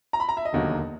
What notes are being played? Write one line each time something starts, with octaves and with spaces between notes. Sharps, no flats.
A#5
B5
A#5
E5
D#5
E1 D#2 D3 F#3 A#3